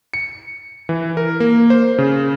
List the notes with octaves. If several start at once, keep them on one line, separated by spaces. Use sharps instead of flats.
C#7
E3
A#4
A#3
C5
C#3